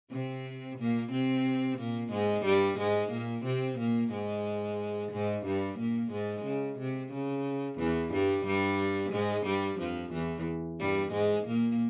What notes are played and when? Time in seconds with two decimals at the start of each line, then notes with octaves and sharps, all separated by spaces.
0.11 C3 C4
0.78 A#2 A#3
1.11 C3 C4
1.78 A#2 A#3
2.11 G#2 G#3
2.45 G2 G3
2.78 G#2 G#3
3.11 A#2 A#3
3.44 C3 C4
3.78 A#2 A#3
4.12 G#2 G#3
5.11 G#2 G#3
5.46 G2 G3
5.78 A#2 A#3
6.11 G#2 G#3
6.45 C#3
6.79 C3
7.13 C#3
7.78 E2 E3
8.12 G2 G3
8.45 G2 G3
9.12 G#2 G#3
9.46 G2 G3
9.79 F2 F3
10.12 E2 E3
10.79 G2 G3
11.12 G#2 G#3
11.46 A#2 A#3